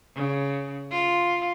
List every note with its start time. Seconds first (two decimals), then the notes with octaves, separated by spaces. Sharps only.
0.16 C#3
0.91 F4